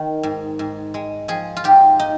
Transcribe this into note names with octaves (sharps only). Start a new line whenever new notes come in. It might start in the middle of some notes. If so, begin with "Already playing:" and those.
Already playing: D#3
G#2
G#2
G#3
F3 G#4
F4
G#2 G4
D#4